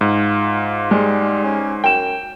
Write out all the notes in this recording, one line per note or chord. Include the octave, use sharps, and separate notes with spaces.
G#2 F4
G3 G#3
C#4
F#2 G5 E7